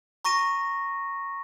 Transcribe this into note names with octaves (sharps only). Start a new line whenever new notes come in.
A#5 C#6 A#6 D#7